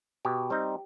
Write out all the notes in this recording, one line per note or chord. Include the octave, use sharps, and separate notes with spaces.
B2 G4
G3 C4 D#4